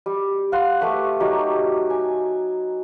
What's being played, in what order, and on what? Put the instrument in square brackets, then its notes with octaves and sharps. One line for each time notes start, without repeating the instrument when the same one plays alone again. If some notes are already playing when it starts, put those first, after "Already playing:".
[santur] G3
F5 F#5 C6
A3 G4 B4 C#6
F#3 D#4 G4 D6
G#5